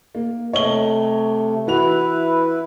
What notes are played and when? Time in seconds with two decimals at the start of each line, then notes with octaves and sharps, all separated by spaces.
0.15 A#3
0.53 C3 A3 C#5 D#5 G7
1.67 E3 E4 F#4 B4 F7